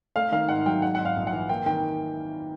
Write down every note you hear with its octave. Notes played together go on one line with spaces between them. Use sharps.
A3 F5
D#3 F5
G#2 F#5
F#3 G5
G#3 F#5
G#2 F#5
F5
A#1
F#5
E3
A#3 G5
D#3 G5